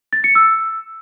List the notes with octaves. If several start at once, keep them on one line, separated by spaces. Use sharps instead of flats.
A6
C#7
E6